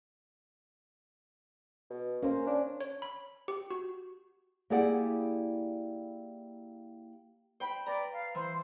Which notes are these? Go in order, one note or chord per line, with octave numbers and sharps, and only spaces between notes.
B2
A#3 C#4 C5
D4
C#5
B5
G4
F#4
A#3 E4 G4 G#4 D5 F#5
C5 G5 B5
B4 D5 A#5
F5
E3 C5